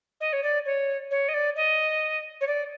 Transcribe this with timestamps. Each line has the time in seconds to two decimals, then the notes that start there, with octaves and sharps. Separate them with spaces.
0.20 D#5
0.33 C#5
0.43 D5
0.65 C#5
1.11 C#5
1.28 D#5
1.34 D5
1.56 D#5
2.41 C#5
2.47 D5